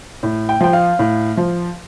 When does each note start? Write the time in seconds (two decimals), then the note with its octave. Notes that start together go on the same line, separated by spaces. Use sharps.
0.23 A2
0.49 G5
0.61 F3 G5
0.73 F5
0.99 A2
1.37 F3